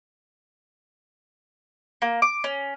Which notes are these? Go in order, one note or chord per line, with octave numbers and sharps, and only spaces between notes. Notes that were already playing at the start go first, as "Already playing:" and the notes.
A#3
D6
C#4